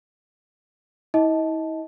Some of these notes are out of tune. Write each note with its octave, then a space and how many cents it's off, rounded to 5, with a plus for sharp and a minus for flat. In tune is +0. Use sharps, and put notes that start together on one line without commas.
E4 -40 D#5 +25 A5 -10